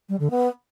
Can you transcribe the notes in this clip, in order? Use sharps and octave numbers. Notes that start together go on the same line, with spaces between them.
G3
D3
B3